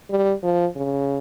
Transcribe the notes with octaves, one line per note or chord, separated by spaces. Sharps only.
G3
F3
C#3